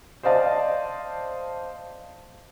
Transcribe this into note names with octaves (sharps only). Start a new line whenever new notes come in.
C5 D5 D#5 F5 A5